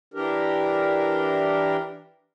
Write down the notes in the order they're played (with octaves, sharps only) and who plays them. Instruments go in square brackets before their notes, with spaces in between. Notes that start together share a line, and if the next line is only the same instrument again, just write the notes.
[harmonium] E3 D4 G4 A#4